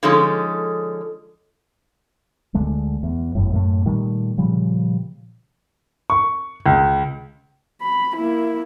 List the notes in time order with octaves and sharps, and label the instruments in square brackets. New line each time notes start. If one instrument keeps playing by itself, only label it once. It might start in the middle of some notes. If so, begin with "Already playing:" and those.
[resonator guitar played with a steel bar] D3 F3 G#3 C#4 D#4 A4
[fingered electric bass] D2 D3 G#3 A3
E2
G1 F#2 A2
F#2 A2 A3
A#2 D#3 G3 A3
A#2 C#3 F3 G3
[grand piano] C#6
C#2
[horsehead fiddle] B5
A#3 E4